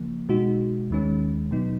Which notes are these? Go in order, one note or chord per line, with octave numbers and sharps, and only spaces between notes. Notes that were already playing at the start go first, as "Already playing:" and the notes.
Already playing: C#3 F3 A#3
B2 G#3 D#4 F#4
D#2 D#3 G#3 C#4
B2 F#3 B3 D#4